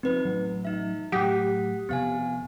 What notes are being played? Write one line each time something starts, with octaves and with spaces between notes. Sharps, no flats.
F3 G3 C4 D#4 B4
A1 F#3
D#4 E5
A2 F#3 G4 F#5 D#6 B6
F2 C3 B3 F5 G#5